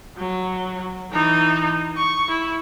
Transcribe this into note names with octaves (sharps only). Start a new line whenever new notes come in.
F#3
E3 D#4
C#6
E4